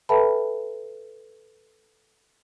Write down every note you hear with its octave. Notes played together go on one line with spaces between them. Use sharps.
A4 B4 E5 G5 A5 B5